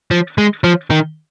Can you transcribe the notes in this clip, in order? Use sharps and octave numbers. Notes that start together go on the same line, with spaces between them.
F3
G#3
F3
D#3